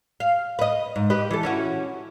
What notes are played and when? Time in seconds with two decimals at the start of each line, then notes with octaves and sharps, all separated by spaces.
0.20 F5
0.59 B4 D#5
0.96 G#2
1.10 G4 B4 D#5
1.31 E3 A4
1.43 C#4 E4 F#4